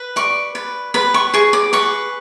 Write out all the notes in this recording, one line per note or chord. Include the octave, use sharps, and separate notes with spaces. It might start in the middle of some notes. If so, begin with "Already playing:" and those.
Already playing: B4
D5 C#6
B4
B4 B5
C#6
G#4 C#6
D6
B4 C#6